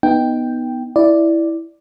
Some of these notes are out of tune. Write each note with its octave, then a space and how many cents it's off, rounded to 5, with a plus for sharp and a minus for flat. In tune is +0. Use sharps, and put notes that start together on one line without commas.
B3 +0 D#4 +0 G5 +0
E4 +0 D5 +0